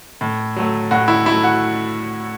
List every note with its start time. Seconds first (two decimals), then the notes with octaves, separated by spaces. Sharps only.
0.21 A2
0.56 F#3 A3
0.91 A2 F#4
1.08 E4
1.26 F#3 A3 E4
1.43 F#4